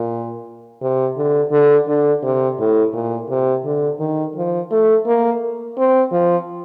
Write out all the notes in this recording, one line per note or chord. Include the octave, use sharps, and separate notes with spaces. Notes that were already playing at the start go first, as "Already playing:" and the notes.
Already playing: A#2
C3
D3
D3
D3
C3
A2
A#2
C3
D3
D#3
F3
A3
A#3
C4
F3